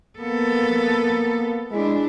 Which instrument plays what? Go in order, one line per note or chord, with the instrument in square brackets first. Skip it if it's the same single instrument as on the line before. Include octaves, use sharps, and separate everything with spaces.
[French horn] A#3 [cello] B3 A4
[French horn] G#3 [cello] D4 E4